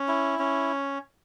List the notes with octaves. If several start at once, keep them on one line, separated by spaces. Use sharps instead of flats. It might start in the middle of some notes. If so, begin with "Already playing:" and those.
Already playing: C#4
E4
C#4